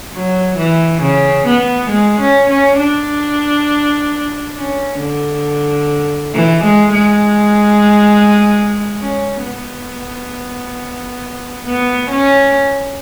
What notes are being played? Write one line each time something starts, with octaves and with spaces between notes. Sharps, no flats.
F#3
E3
C#3
B3
G#3
C#4
C#4
D4
C#4
D3
E3
G#3
G#3
C#4
B3
B3
C#4